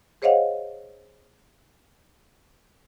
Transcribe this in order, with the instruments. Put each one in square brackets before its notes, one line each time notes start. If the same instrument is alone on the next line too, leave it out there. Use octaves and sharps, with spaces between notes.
[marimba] G#4 C5 C#5 D#5 F5 F#5